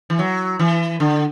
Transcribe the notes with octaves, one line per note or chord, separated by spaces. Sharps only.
E3
F#3
E3
D3